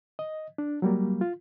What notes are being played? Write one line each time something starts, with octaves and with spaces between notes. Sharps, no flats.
D#5
D4
F#3 G3 A#3
F4